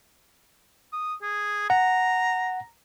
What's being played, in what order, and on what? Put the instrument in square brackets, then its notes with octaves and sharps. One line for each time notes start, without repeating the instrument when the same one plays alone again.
[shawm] D#6
G#4
[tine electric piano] F#5 [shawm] A#5